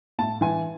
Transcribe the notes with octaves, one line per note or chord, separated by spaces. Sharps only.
A2 A5
E3 G#5